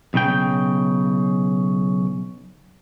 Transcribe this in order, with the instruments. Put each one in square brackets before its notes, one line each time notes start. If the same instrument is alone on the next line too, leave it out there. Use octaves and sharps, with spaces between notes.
[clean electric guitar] B1 C#3 G5